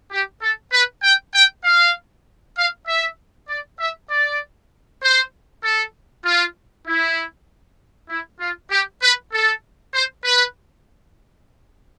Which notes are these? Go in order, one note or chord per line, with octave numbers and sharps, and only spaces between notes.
G4
A4
B4
G5
G5
F5
F5
E5
D5
E5
D5
C5
A4
F4
E4
E4
F4
G4
B4
A4
C5
B4